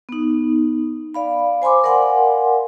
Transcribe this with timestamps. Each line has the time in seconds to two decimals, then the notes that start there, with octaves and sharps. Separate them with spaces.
0.09 B3 D#4
1.14 D5 F5 B5
1.62 C5 G#5 B5 C6 D6
1.84 A#4 D5 F5 F#5 G#5 C6